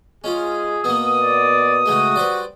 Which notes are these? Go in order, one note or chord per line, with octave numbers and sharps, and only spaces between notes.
G#3 C#4 F4 G#4
B2 A#3 B3 D#6
D5
C#3 G#3 A3 F#4
G3 B4 C5 D5